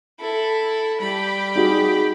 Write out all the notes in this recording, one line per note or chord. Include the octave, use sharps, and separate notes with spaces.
E4 A4
G3 G4 B5
D#4 F#4 G#4